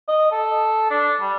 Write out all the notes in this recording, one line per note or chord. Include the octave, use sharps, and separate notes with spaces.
D#5
A4
D4
G3